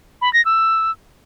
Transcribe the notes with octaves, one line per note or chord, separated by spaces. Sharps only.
B5
A#6
E6